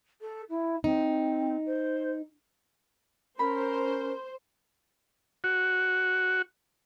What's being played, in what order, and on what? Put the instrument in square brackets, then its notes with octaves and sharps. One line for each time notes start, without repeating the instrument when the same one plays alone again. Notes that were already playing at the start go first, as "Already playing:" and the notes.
[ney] A4
E4
[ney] C4 [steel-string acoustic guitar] D#4
[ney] C5
[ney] C#4 [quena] A#4 [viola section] C5 [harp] B5
[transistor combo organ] F#4